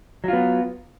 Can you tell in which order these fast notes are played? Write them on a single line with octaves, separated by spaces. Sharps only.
F#3 F4 B3